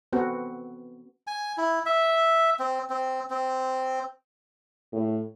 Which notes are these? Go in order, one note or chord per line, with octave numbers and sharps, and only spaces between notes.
B3 C4 F#4 A4
G#5
E4
E5
C4
C4
C4
A2